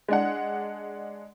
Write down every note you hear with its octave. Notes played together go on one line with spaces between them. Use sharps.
G#3 D4 F#5